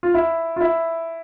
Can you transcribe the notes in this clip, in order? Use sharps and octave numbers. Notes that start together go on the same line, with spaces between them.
F4
E4
F4
E4